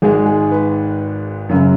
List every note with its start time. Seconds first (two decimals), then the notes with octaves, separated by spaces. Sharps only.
0.02 G#1 G#2 G#3 G#4
0.26 G#4
0.51 B4
1.49 F#2 C#3 F#3